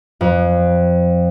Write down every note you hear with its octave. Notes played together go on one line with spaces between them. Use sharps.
F2